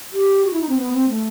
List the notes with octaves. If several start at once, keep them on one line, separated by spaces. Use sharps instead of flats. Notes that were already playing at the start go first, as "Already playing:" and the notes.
G4
F#4
E4
D#4
C4
B3
C4
A3